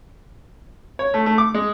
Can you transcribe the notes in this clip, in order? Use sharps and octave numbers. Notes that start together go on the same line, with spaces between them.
C#5
A3
A3
D6
G#3